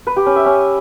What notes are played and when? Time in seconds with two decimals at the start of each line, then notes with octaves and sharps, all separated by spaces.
0.07 B4
0.16 G4
0.26 C#4
0.36 E5
0.46 C#4